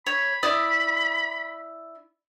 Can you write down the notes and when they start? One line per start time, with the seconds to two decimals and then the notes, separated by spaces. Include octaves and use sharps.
0.06 C#5 B5
0.43 E4 D5 D#6